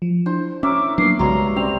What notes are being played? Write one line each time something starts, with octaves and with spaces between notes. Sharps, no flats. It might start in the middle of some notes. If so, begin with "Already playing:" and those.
F3
D4 E4 C5
C#4 A#4 C#5 E5 D6
F#3 A#3 B3 D4 C7
B1 G2 C#3 G#3 F#4 C#5 A#5 C6
G3 C4 C#4 F7